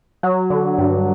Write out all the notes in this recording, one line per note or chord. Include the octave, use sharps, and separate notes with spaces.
F#3
D3
G2